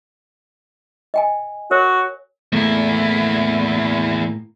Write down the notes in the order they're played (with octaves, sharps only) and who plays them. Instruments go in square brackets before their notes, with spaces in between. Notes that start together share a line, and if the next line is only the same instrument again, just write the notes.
[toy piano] D#5 G5 G#5
[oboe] F#4 [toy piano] A#4 C#5
[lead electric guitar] E2 E4 [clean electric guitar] A2 A3 A#3